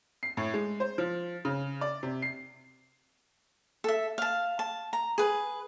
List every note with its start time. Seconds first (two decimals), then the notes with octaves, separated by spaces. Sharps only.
0.23 C7
0.37 A2
0.54 G#3
0.80 C5
0.98 F3
1.45 C#3
1.81 D5
2.03 C3
2.22 C7
3.84 A4 E5
4.18 F5 A5
4.59 A5
4.93 A#5
5.18 G#4 B4